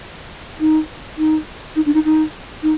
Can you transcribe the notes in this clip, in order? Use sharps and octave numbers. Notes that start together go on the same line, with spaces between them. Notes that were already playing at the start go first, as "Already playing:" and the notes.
D#4
D#4
D#4
D4
D#4
D#4
D#4